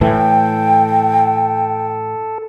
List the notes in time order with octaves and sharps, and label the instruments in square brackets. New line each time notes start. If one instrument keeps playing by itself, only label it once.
[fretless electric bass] A2 E3 [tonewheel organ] A4 [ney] G5